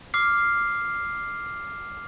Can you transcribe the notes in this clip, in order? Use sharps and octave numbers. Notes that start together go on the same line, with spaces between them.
D6 F6 C7